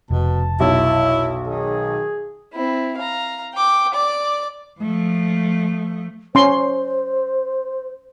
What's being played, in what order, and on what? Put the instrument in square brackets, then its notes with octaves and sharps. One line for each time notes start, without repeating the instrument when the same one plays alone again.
[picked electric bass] F1 [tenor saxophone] B2 [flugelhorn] A5
[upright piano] B1 [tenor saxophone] E4
[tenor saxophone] D#3 [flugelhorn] G#4
[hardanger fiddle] C4 E4
F5 A#5
G5 D6
D5 D6
[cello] F3 A3
[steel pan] C#4 C6 [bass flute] C5